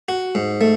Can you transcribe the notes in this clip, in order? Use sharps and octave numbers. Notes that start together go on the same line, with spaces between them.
F#4
G#2
A3